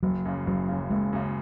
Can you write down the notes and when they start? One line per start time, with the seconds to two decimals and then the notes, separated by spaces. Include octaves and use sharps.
0.03 F#1 F#3
0.25 F#2 C#3
0.47 F#1 F#3
0.68 F#2 C#3
0.90 F#1 G#3
1.13 F#2 C#3